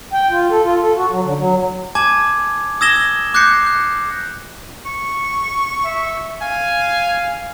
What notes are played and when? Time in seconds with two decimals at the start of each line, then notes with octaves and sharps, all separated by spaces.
0.13 G5
0.30 F4
0.50 A4
0.64 F4
0.81 A4
0.96 F#4
1.10 F#3
1.24 D3
1.37 F#3
1.95 G#5 A5 D6 G#6
2.81 D#6 E6 G#6 A#6 E7 G7
3.34 D6 F#6 G6 A#6 C7 C#7
3.67 F#6
4.86 C#6
5.84 E5
6.42 F5 G#5